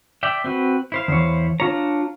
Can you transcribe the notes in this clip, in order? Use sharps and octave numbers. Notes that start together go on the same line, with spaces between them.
D5 E5 G5
C4 F#4 B4
E4 C5 F5
E2 C#5
D4 F4 C#5 A#5